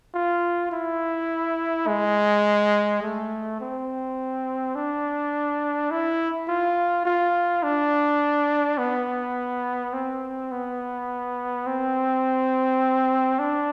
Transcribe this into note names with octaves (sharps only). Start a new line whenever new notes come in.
F4
E4
G#3
A3
C4
D4
E4
F4
F4
D4
B3
C4
B3
C4
D4